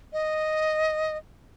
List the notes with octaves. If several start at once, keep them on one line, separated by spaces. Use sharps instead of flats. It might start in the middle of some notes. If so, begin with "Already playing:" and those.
D#5